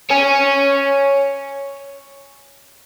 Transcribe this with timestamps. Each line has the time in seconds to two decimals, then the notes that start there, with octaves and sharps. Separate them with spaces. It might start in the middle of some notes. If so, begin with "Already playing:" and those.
0.10 C#5 G#5